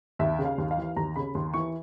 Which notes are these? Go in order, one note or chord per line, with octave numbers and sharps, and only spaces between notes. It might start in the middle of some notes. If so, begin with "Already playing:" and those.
D#2 E5
C#3
F5
D#2
F5
E3
D#2 A#5
C#3 B5
D#2 C6
E3 C#6